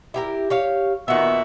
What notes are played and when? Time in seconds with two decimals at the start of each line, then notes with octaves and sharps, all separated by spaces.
0.14 E4 G4 A#4
0.50 G4 C#5 F5
1.08 A#2 D#3 B3 F#4 E5